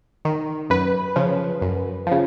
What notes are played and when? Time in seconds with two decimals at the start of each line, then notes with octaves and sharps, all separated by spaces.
0.25 D#3
0.70 F#2 B4
1.16 C#3 F3
1.61 F#2
2.07 C#3 F3